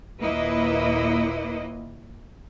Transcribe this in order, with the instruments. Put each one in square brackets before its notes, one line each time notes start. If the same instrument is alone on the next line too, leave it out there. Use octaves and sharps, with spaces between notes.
[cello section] D#2 A#2 A#3 E4 B4 D#5